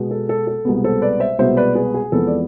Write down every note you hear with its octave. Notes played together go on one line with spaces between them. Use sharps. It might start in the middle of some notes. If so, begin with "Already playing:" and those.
Already playing: B2 G#3 B3
A4
A4
A4
C2 B2 G#3 B3
A4 C5
B4 D5
C5 E5
C2 B2 G#3 B3 C5 E5
B4 D5
G#4 B4
G#4
F2 E3 G#3 B3 A4
D5